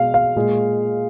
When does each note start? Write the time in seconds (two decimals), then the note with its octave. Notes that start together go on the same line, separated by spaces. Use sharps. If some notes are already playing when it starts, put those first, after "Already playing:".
Already playing: B2 G#3 F5
0.14 F5
0.36 A#2 G#3